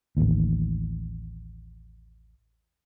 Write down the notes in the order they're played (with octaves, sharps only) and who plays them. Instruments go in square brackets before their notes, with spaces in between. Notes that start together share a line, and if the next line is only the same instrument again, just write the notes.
[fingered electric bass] A1 D#2